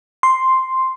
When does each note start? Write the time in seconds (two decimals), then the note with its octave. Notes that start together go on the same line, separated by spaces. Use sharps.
0.23 C6